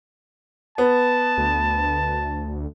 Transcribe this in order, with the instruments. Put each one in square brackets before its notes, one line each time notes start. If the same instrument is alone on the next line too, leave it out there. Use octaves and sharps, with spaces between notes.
[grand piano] B3 [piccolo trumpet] A5
[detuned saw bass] D2